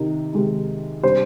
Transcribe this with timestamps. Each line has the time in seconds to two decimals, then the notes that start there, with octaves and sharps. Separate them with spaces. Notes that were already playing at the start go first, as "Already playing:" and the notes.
Already playing: C3 D#3 D#4
0.33 C3 D#3 G#3 D#4
1.03 C3 G3 D4 C5